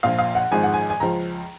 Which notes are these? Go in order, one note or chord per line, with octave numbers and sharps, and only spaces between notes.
A#1 A#2 F3 F5
F5
F#5
G#1 G#2 F3 G#3 G#5
F#5
G#5
G#5
C#2 C#3 F3 A#5